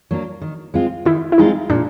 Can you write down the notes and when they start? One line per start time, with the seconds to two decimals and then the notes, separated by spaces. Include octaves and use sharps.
0.11 F#3 A#3 D4
0.41 D#3
0.74 G#3 C4 F4
1.05 D#3 E4
1.32 E4
1.38 G#3 C4 D#4 F4
1.70 A#2 D4